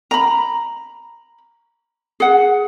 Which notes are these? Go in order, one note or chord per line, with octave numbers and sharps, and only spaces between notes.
A#5 B5
G#4 F#5